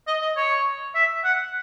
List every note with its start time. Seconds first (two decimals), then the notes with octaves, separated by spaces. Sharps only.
0.07 D#5
0.21 D#5
0.36 C#5
0.95 E5
1.24 F#5